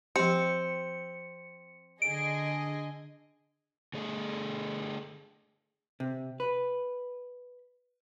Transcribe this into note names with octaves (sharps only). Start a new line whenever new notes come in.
F3 C4 G4 C#7
D3 G#4 D#5 D7
D3 A3 G#4 A4
C3
B4